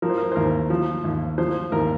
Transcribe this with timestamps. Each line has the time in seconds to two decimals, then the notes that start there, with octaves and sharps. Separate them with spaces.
0.02 F3 A#4
0.10 C5
0.18 A#4
0.32 C5
0.36 D#2 A#4
0.70 F3
1.04 D#2
1.38 F3 C5
1.72 D#2 A#4